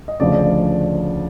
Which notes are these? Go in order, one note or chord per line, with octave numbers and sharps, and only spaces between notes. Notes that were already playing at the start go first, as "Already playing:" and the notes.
D#5
D2 C#3 F3 D5